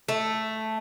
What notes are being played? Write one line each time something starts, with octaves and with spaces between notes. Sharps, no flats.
A3